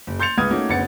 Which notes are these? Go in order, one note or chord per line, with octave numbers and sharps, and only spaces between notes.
F#1
C6 G6 A6 C#7 F7
C#2 A#3 B4 D#6 F6 G#6
A3 A#3 C#4 D#4 F#4
F#1 D2 B3 C#4 A6 C#7